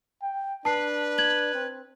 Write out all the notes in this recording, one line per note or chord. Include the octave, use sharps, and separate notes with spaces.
G5
D4 B4 A5 C7
G#6 F#7
C4